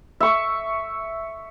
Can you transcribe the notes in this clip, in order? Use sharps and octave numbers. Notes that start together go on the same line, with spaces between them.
E5 C#6